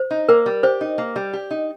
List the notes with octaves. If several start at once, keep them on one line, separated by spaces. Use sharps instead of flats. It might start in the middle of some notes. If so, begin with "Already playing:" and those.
Already playing: C5
D#4
A#3 A#4
G3
G4 C5
D#4
A#3
G3
G4
D#4